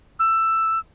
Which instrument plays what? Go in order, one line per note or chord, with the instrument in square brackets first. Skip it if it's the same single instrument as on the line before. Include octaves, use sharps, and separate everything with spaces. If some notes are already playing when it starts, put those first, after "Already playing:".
[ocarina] E6